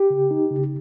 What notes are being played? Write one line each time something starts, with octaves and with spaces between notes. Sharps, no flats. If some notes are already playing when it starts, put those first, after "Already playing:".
Already playing: G4
C#3
D#4
C#3